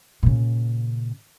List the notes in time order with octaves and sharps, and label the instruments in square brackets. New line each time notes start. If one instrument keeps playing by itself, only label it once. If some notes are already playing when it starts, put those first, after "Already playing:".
[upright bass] A#2 C#3